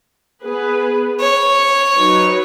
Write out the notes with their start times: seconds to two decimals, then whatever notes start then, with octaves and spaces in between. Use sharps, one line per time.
0.45 B3 G#4 B4
1.20 C#5
1.96 F#3 D#4 B4